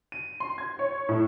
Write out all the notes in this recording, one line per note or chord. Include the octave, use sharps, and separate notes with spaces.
D#7
C6
G#6
C#5
A2